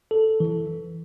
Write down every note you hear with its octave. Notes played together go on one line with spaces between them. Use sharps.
A4
E3